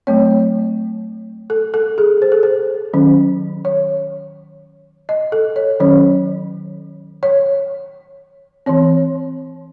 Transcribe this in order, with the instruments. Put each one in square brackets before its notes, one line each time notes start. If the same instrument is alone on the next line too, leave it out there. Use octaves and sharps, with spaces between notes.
[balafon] F#3 A3 C4 C#5
A4
A4
G#4
C5
A4
C5
D#3 F#3 C#4
C#5
D#5
A4
C#5
D#3 F#3 C#4 C#5
C#5
E3 C4 C#5